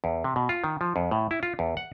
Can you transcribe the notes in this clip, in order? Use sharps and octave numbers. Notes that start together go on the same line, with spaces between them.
E2
C3
B2
F4
D#3
F3
F2
A2
E4
F4
E2
F#5